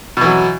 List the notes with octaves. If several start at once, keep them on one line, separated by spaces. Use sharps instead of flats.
B2 E3 F#3